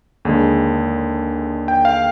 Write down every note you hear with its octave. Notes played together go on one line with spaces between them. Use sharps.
D#2 D3 G#3 G#4
G5
F5